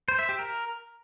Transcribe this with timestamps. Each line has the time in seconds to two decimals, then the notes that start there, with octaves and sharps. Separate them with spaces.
0.08 C5
0.19 E5
0.29 G4
0.39 A#4